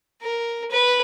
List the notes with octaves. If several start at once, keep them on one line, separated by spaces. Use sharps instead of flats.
A#4
B4